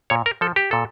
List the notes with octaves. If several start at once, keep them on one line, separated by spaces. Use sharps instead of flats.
A#2 C#5
A#4
F3 A4
G4
A#2 A4